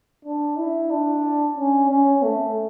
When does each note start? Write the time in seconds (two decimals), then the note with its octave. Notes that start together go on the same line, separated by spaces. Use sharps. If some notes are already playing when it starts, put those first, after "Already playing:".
0.25 D4
0.58 E4
0.91 D4
1.57 C#4
1.90 C#4
2.23 A3